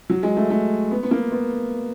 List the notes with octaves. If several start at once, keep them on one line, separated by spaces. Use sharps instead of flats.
F#3
G#3
A3
A3
B3
B3
A#3
B3